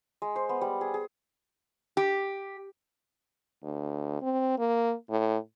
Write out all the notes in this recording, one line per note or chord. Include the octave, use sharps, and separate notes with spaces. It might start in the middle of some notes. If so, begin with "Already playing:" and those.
G#3
C5
B3
G3
G#4
G#4
G4
D2
C4
A#3
A2